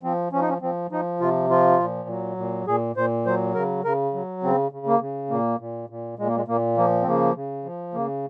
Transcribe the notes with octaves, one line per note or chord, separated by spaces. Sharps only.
F3 C4
F3 C#4
D#4
C#4
F3 C4
F3 D#4
C3 F4
F3 F4
A#2
F#3
A#2
A#2 G#4
A#2 C5
F#3 C5
C#3 A#4
C#3 A#4
F#3
C#3 C4
C#3
A#3
C#3
A#2 A#3
A#2
A#2
A#2 G#3
A#3
G#3
A#2 A#3
F3 A#3
C4
C#3 A#3
C#3
F3
C#3 A#3